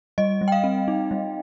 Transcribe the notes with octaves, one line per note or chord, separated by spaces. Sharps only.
G3 D#5
G3
G5
F5
C4
D#4
G3